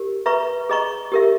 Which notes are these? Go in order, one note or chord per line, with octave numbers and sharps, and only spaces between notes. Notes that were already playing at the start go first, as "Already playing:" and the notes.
Already playing: G4 A#4
B4 E5 A#5 C#6
G#4 D#5 A#5 C#6
G4 A#4 E5